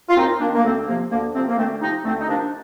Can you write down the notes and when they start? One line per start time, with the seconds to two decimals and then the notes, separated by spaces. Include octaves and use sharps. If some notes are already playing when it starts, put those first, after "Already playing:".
0.09 F4
0.16 D#2 C4 D#4
0.40 D#3 A#3 D4
0.55 A#3
0.64 D2 A3 C4
0.87 C3 A#3
0.90 F3
1.10 D2 A#3
1.34 C3 F3 A3 C4
1.48 A#3
1.58 D2 A3 C4
1.81 C3 F3 C4 D#4
2.04 D2 A3 C4
2.20 D#4
2.28 C3 F3 A#3 D4